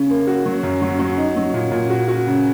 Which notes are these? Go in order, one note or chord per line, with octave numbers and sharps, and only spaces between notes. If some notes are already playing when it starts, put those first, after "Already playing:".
Already playing: C#3 C#4
A#3
F#4
F#3
F#2
F#3
F#3
D#4
F#3
A#2
A#2
F#4
F#4
C#3